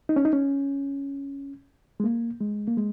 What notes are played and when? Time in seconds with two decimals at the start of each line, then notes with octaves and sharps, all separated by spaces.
0.09 D#4
0.16 C#4
0.25 D#4
0.33 C#4
2.00 G#3
2.04 A#3
2.40 G#3
2.67 A#3
2.77 G#3